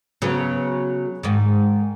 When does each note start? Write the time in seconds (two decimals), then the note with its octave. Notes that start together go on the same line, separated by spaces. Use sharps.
0.22 C#3 F#3 B3
1.23 G#2 D#3